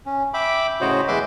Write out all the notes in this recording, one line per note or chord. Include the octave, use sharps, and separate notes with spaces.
C#4
E5 G5 B5 D6
A2 C#3 F#4 C5 C#5 D#5
E2 G#3 B4 E5 C6 D6